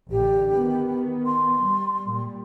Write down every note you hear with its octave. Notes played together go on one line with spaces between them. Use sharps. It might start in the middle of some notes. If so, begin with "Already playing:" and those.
A1 D3 G4
D#3 B3
C6
G3
A#2 G3